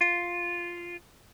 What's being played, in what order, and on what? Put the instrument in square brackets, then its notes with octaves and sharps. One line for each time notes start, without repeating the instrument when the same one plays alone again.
[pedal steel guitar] F4